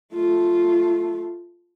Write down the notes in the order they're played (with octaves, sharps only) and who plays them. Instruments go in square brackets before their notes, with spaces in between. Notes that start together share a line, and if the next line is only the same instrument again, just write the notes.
[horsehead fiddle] A3 F4